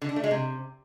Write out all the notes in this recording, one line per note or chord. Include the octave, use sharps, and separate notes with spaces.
D3
D4
A3
G#3
C3